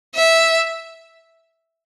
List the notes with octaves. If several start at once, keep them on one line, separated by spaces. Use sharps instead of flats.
E5